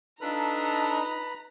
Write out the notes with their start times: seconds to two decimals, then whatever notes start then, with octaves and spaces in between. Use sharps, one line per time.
0.21 D4 D#4 F4 A4 B4 A#5 B5